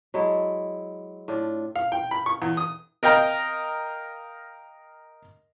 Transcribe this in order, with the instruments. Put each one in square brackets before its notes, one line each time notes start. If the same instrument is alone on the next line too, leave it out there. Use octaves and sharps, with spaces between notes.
[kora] F#3 G#3 E4 A4
A2 D4 F4
[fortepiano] F5
G5
B5
C#6
E2
D#6
A#4 D#5 F5 G5 A#5